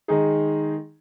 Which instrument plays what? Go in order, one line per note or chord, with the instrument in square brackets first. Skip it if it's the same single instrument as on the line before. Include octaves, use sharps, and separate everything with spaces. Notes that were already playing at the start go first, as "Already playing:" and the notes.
[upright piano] D#3 G#3 D#4 G#4